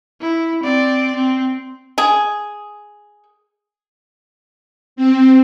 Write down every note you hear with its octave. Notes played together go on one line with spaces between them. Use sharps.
E4
C4 D5
C4
G#4
C4